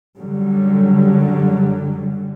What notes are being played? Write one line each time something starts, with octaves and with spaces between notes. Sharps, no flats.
F#2 D3 F#3 G3